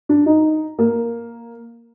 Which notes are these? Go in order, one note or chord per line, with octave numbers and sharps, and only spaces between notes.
D4
D#4
A#3